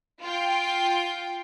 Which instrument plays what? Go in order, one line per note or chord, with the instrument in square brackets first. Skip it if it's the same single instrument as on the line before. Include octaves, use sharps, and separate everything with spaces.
[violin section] F4 G5